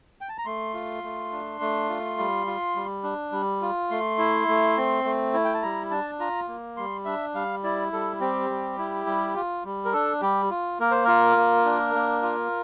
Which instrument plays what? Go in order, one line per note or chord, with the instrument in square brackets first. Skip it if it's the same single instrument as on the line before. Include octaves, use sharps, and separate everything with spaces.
[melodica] G5
A5
A#5
A3 C6
F4
A3
D4
A3
F4
G3
F4
G3
D4
G3
F4
A3 C6
E4
A3
C4
A3
E4
G5
A5
G3 A#5
D4 A5
F4 A#5
A#3
G3 C6
D4 E5
G3 F5
E4 D5
G3 A4
C4 G4
G3
E4
G3
F4
G3
A#4
D4 A4
G3 G4
F4
A#3 A#4
C5
F4 A#4
A#3
D4
A#3
F4